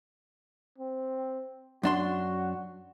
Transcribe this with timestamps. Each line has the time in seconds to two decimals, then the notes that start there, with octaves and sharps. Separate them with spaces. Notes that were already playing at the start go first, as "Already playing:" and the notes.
0.78 C4
1.83 F#2 D4 F#4 C6